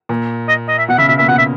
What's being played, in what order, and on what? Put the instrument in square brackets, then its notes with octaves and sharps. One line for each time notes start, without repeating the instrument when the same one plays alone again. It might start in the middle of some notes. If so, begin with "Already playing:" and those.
[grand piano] A#2
[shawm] D#5
D#5
E5
[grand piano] B2 [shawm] F#5
[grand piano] C#3 [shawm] E5
[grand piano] B2 [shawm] E5
[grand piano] A#2 [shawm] E5
[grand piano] B2 [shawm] F#5
[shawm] E5